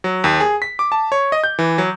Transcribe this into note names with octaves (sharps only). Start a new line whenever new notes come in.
F#3
D#2
G#4
B6
D6
A5
C#5
D#5
G6
E3
F#3